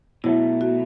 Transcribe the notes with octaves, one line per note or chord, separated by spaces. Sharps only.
B2 F#3 A3 E4
F#4